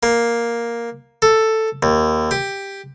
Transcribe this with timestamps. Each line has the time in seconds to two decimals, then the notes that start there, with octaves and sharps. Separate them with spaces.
0.03 A#3
1.22 A4
1.83 D#2
2.31 G4